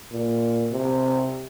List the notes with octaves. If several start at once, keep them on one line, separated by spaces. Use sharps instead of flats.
A#2
C3